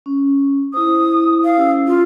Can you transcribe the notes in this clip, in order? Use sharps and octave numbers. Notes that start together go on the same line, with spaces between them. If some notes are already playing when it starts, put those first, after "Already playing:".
C#4
E4 C5 D#6
F5
C#4 G4 E6
F4